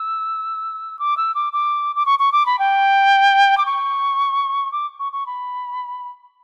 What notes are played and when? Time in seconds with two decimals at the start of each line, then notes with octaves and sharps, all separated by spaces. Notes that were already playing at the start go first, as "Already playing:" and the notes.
Already playing: E6
0.99 D6
1.17 E6
1.34 D6
1.53 D6
1.96 D6
2.06 C#6
2.19 C#6
2.32 D6
2.46 B5
2.59 G5
3.58 D6
3.66 C#6
4.72 D6
4.99 C#6
5.12 C#6
5.26 B5